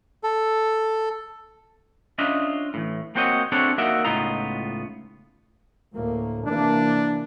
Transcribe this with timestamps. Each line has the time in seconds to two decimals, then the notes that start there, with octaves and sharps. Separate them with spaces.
0.23 A4
2.18 C#4 D4 F4 D#5 E5
2.74 A2 E3
3.15 A#3 C4 F#4 C5 C#5 D#5
3.52 C4 D4 E4 F#4 A4 C#5
3.78 A#3 D#4 F#4 D5 E5
4.05 C#2 A2 B3 D#4 F4 A#5
5.93 D2 A2 A#3
6.46 C3 E3 A#3 D4